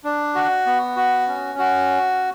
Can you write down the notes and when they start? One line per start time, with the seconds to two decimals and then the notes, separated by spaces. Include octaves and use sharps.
0.04 D4
0.35 F#4
0.66 B3
0.96 F#4
1.28 C#4
1.59 F#4